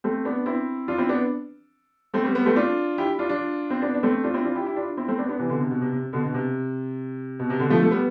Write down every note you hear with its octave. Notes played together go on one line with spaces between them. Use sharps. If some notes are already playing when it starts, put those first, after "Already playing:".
A3 C4
B3 D4
C4 E4
D4 F4
C4 E4
B3 D4
A3 C4
G3 B3
G3 B3
A3 C4
D4 F4
E4 G4
D4 F4
D4 F4
C4
B3 D4
D4
A3 C4
D4 F4
C4 E4
D4 F4
E4 G4
E4 G4
D4 F4
C4 E4
A3 C4
B3 D4
B3 D4
C3 E3
B2 D3
C3
B2
C3
C3
B2 D3
B2
C3
B2
C3
B2 D3
F3 A3
A3
G3 B3